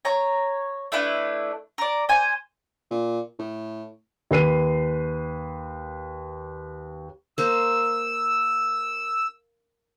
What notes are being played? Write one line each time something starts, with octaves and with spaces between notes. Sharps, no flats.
C#5 A#5
A3 D4 E4 B4
A#4 D5
C5 G#5
A#2
A2
D#2 B4 C7 D#7
A#3 C5 E6